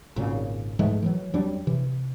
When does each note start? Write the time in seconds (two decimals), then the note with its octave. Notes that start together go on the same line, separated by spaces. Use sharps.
0.16 G#1 A#2 C#3
0.79 G#2 E3 G#3 A3
1.02 D#3 E3 F#3
1.33 F2 F#3 G3 D4
1.67 C3 E3